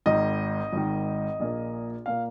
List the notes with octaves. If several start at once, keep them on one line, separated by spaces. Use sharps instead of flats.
G#1 G#2 D#3 D#5
G#1 G#2 D#3
A#1 A#2 A#3
A#2 A#3 F5